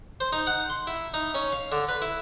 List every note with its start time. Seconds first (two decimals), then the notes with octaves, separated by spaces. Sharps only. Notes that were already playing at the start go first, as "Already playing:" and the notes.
0.20 C5
0.32 D#4
0.47 F#5
0.70 C6
0.87 E4
1.14 D#4
1.34 C#4
1.52 F5
1.72 D3
1.89 B4
2.02 E4